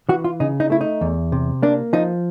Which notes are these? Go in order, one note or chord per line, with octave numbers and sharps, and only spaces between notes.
E3 F#4
F4
C#3 D#4
D#4
A3 E4
D#4
E2
C3
A#3 D4
F3 D#4